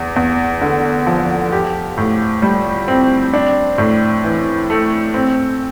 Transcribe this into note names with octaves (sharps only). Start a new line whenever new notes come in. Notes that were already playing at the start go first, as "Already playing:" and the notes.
Already playing: E2
E2
D3
F3
G4
A2
G3
C4
D4
A2
E3
A3
C4